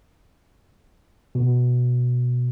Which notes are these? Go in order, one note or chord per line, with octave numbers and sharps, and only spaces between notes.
B2